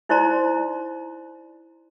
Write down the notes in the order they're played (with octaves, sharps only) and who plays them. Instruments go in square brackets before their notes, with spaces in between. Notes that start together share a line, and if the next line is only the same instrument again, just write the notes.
[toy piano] D#4 E4 C5 D5 A#5 C6